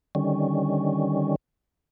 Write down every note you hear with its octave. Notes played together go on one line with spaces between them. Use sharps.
D3 D#3 G3 C#4